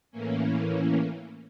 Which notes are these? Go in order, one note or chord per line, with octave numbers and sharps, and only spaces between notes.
A2 E3 A#3 C#4